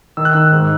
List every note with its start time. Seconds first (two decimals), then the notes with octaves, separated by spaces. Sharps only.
0.17 D#3 E6
0.25 F#6
0.33 D#3 E6
0.52 G#2